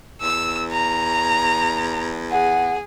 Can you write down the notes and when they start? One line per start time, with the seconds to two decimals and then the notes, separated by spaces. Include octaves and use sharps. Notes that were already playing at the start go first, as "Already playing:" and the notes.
0.22 E2 E6
0.72 A#5
2.31 G#4 F#5